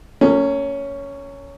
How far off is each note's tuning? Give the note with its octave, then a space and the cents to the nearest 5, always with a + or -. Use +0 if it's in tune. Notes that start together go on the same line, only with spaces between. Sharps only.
A#3 -40 C#4 +10